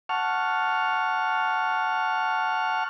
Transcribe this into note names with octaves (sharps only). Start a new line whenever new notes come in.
F#5 A5 C#6 F6